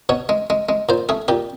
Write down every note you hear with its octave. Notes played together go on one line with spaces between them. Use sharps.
B2 C#5
G#3
G#3
G#3
A#2 C5
A3 G#4
A#2 G4